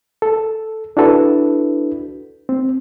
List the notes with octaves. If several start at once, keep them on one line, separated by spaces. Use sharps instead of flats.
A4
D4 E4 F#4 A4 B4
C4